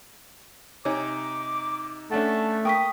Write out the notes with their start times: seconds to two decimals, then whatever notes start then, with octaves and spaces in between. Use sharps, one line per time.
0.85 C3 D#4 C#5 G#5 D6
2.11 A3 C#4 D4 F#5 A5
2.65 A#3 G5 C#6 D#6 B6